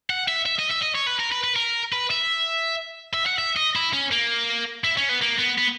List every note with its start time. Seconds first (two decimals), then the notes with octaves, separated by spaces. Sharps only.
0.10 F#5
0.28 E5
0.46 E5
0.59 D#5
0.71 E5
0.83 D#5
0.95 C#5
1.07 B4
1.19 A#4
1.32 B4
1.44 B4
1.56 A#4
1.92 B4
2.11 E5
3.14 E5
3.26 F#5
3.39 E5
3.57 D#5
3.76 E4
3.93 C#4
4.12 A#3
4.84 E4
4.97 C#4
5.09 B3
5.21 A#3
5.39 B3
5.58 B3